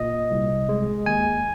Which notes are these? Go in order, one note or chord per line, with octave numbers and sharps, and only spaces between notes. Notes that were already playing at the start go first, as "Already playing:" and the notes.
Already playing: A#2 D#5
C2
G#3
D#2 G#5